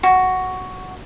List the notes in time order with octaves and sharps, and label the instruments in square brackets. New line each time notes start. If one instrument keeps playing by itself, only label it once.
[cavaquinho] F#4